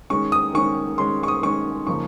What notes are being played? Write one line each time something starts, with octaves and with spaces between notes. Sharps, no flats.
D#3 G#3 C#4 C#6
D#6
D#3 G#3 C#4 C#6
D#3 G#3 C#4 C6
C#6
D#6
D#3 G#3 C#4 C#6
C#3 F3 A#3 D#4 C#6